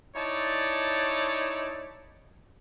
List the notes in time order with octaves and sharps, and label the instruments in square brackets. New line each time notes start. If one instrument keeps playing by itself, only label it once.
[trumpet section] D#4 E4 C#5 D5 A5